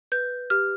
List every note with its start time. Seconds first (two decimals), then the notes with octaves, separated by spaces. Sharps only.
0.12 B4 G6
0.50 G4 F6